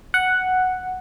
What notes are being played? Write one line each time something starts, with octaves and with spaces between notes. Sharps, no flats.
F#5